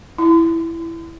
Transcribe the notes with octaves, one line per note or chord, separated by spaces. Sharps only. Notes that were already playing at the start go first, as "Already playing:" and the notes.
E4